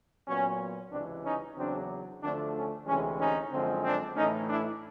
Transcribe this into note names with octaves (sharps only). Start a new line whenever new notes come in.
A#2 F#3 B3 C#4
C#2 C3 E3 C4 D4
C#4 D#4
E2 C#3 F#3 C4 D4
D2 D3 F3 A3 C4 D4
C#4
D2 C3 E3 G#3 C#4
C#4 D#4
F#2 D3 F3 G#3 C4
C4 D4
A2 E3 A3 C#4 D#4
D4 E4